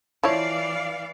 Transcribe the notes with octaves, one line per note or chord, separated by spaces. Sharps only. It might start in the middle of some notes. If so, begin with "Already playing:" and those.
E3 F3 E4 C#5 D5 F5